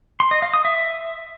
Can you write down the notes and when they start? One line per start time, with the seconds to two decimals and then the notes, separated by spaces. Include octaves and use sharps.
0.20 C6
0.31 D#5
0.42 F5
0.54 D#6
0.65 E5